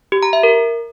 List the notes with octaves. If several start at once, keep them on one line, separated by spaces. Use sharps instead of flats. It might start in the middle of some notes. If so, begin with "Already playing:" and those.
G4
A#5
E5
A#4